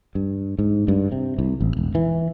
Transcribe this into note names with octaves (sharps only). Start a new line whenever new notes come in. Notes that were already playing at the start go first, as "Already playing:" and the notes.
G2
G#2
G2
C3
C2
A1
E1
E3